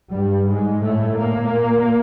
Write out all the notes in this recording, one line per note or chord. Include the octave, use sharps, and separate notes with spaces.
G2 G3
G#2 G#3
A2 A3
A#2 A#3